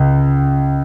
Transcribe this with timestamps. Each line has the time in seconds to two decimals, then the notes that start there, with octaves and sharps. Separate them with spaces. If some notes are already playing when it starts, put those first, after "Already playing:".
Already playing: C#2